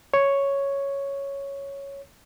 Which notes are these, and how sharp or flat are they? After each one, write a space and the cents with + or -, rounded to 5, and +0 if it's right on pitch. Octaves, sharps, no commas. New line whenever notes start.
C#5 +0